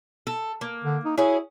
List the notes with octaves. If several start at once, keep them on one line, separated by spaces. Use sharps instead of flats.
A4
A#3
D3
D#4
C#4 E4 F#4 G#4